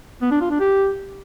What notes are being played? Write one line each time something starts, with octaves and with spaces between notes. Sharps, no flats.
B3
D4
F4
D4
G4